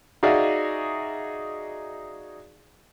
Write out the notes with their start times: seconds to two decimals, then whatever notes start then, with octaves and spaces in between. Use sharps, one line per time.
0.23 D#4 F#4 G#4 D5 E5 F5